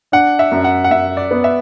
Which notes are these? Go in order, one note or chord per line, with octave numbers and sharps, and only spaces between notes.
D4 F#5
E5
F#2
F#5
F#5
F#2 E5
D5
B3
E5